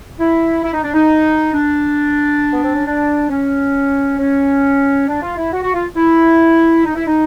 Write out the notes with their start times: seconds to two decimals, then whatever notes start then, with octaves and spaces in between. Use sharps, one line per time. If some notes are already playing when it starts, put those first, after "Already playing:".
0.20 E4
0.64 E4
0.74 D#4
0.83 D4
0.94 D#4
1.53 D4
2.53 B3
2.64 C4
2.75 C#4
2.86 D4
3.30 C#4
4.19 C#4
5.08 D4
5.22 F4
5.37 E4
5.53 F#4
5.63 F#4
5.74 F4
5.97 E4
6.86 D#4
6.96 E4
7.07 D#4